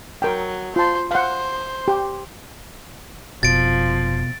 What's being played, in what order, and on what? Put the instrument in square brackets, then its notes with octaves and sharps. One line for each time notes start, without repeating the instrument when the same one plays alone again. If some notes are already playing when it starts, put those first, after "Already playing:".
[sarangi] F#3 [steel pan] A#4 G5
[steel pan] F4 A5 [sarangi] C5
[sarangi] C5 [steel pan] F5 F#5
[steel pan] G4
[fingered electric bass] F1 [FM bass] B2 [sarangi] F3 [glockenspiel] A6 D7